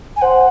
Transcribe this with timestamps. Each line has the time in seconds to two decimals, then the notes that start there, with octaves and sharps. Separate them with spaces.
0.16 G#5
0.22 C5 F#5